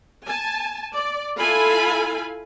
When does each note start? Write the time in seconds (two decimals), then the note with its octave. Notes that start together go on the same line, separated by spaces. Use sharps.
0.25 G#5 A5
0.96 D5
1.37 E4 F4 A4 F5 G#5 B5